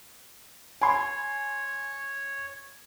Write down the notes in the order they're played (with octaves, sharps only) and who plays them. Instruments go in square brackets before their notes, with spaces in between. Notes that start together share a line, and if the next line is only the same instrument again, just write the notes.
[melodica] C#5 [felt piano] G#5 C6